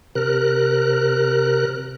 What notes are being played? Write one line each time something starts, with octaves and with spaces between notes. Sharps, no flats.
C3 A#4 F#6